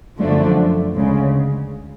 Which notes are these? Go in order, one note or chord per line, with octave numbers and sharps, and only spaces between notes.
F#2 D3 F3 A3 D4
D2 C#3 G#3